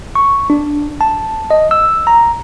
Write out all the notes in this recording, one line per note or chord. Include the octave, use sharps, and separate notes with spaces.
C#6
D4
A5
D#5
E6
A#5